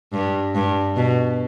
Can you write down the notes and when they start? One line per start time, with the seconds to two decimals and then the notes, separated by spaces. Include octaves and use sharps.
0.13 G2
0.55 G2
0.96 B2